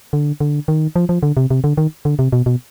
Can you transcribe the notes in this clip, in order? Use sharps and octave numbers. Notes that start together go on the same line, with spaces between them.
D3
D3
D#3
F3
F3
D3
C3
C3
D3
D#3
D3
C3
B2
B2